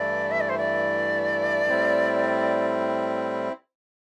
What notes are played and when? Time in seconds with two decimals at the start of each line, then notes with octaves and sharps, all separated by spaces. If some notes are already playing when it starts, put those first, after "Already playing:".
Already playing: G2 E3 A3 E4 D5
0.31 E5
0.40 D5
0.49 C5
0.57 D5
1.69 A2 G3 C4 E4